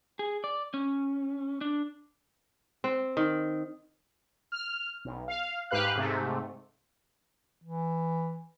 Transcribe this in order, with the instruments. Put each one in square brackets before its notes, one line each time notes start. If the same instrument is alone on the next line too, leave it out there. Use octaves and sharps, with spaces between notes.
[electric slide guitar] G#4
D5
C#4
D4
[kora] C4
D#3
[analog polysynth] F6
B1
F5
G#2 G4 B4 F5 F#6
G#2 C3 A3
[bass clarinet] E3